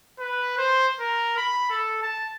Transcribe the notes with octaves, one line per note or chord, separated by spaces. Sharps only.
B4
C5
A#4
B5
A4
A5